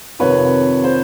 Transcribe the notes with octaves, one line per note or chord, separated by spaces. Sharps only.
F2 C3 D#3 B4 C#5
C5